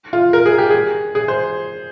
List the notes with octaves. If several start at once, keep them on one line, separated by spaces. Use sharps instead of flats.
F4
A#4
G#4
G4
G#4
G#4
C5